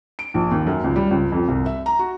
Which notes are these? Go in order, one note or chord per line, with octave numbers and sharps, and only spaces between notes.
D7
A#1
D#2
F#2
C#2
G3
C#2
F2
C2
E5
A#5
F#4